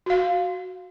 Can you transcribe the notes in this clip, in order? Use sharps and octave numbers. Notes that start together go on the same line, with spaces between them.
F#4 F5